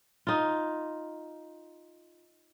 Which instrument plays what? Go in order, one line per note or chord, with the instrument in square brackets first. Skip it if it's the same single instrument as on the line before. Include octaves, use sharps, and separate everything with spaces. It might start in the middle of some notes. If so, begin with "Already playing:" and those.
[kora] D#4 F4